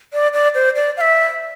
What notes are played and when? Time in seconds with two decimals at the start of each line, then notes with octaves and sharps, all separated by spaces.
0.13 D5
0.34 D5
0.55 C5
0.76 D5
0.97 F5
1.01 E5